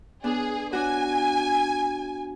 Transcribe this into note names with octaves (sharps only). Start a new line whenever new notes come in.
B3 D4 G#4
D4 F#4 G#5